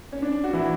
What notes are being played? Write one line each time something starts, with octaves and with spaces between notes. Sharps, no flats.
C#4
D4
F#4
E3 E4